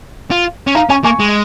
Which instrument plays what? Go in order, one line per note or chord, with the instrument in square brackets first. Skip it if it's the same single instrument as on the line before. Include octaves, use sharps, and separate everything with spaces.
[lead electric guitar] F4
C#4
[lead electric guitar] D#4 [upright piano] F5 A#5
[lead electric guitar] C#4 [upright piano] G#5 C#6
[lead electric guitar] A#3 [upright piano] G#5 C#6
[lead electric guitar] G#3